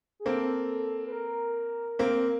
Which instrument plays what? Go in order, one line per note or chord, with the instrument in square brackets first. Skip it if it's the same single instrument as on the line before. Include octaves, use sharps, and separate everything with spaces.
[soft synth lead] G#4
[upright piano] A#3 C4 [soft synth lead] A4
[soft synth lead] B4
A#4
[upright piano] A#3 C4